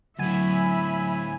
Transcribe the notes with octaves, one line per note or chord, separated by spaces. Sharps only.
D2 A2 F#3 E5 G#5 B5